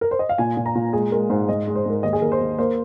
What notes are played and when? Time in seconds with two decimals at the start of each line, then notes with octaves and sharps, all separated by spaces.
0.01 A#4
0.11 C5
0.19 D#5
0.29 F5
0.38 A#2 G#5
0.57 A#2
0.66 A#5
0.75 A#2
0.93 G#3 G#4
1.12 G#3 A#4
1.30 G#2 C5
1.49 G#2 D#5
1.67 G#3
1.75 C5
1.86 G#2 A#4
2.03 D#2 D#5
2.13 G#4
2.22 D#2 A#4
2.32 C5
2.41 D#2
2.58 A#3 C5